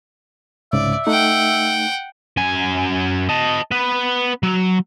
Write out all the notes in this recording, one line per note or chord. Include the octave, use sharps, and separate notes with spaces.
C2 G#2 C#3 D5 E5
A3 D#4 F#5 G5
F#2 G#5
D#5 A5
B3 B4
F#3